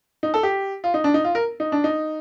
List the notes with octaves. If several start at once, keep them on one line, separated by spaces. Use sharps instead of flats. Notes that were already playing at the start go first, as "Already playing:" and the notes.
D#4
A4
G4
F4
D#4
D4
D#4
F4
A#4
D#4
D4
D#4